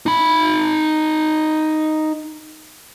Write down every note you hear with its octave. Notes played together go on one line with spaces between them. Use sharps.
D#4 B5